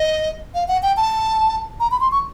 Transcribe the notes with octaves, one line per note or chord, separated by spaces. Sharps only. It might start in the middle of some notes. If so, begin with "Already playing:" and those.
Already playing: D#5
F5
F#5
G5
A5
A#5
B5
C6
C#6